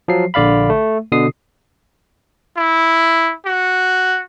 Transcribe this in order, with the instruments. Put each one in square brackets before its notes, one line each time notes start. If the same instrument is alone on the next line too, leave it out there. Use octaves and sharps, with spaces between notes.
[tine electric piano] F3 F#3 C7
A#1 D3 D5 F5 B5
A3
B2 D3 D#6 C7
[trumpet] E4
F#4